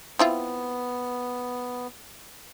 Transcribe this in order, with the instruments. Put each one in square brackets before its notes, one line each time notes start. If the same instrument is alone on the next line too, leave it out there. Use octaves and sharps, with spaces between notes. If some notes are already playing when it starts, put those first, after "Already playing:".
[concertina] B3 [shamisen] C4 E4 F4